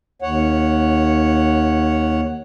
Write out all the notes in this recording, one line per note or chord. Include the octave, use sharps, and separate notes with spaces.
D#2 C#5 F#5